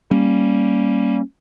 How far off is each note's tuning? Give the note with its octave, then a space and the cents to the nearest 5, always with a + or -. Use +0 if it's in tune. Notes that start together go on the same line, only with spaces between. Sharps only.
G3 +0 A#3 +0 C#4 +0